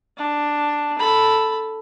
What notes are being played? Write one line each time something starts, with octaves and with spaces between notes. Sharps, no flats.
D4
A4 B5